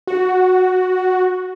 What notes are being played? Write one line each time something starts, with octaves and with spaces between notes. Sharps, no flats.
F#4